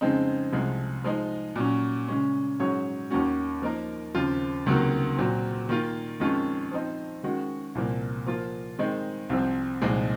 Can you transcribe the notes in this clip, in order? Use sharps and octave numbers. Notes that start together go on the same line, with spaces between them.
F2 C#3 G#3 C4 D#4
C2 C3 F3 G#3
F3 G#3 D#4
A#2 F#3 C#4
C#3 G#3 C#4
G#2 F#3 C#4 G#4 C#5
D#2 D#3 A#3 C#4 F#4
F3 A#3 D#4 A#4
D#2 C#3 F3 C4 F4
C#2 C3 D#3 F#3 A#3
A#2 F#3 C4
D#3 A#3 F4
F2 D#3 G#3 C#4 F4
F3 C4 D#4
D#3 G#3 C#4 F#4
C2 A#2 F3 A#3
F3 A#3 F4
D#3 G#3 C4 D#4
C2 C3 F3 C4
C2 A#2 F3 G#3 D#4